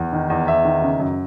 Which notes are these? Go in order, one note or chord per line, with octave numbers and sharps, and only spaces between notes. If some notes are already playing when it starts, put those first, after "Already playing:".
Already playing: E2
D#3
E2
E2 E5
D#3
C#3
F#2